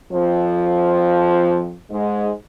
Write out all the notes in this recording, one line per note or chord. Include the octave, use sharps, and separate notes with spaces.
F2 F3
G#2 G#3